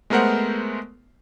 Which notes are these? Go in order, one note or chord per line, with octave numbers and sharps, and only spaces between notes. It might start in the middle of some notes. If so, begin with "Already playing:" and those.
G#3 A3 B3 A#4 C5 F#5